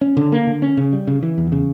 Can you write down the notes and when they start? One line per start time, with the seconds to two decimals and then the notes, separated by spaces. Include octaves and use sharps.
0.01 C#4
0.17 D3
0.32 A#3
0.47 D3
0.62 C#4
0.77 C#3
0.93 G3
1.07 C#3
1.23 E3
1.38 E2
1.52 C#3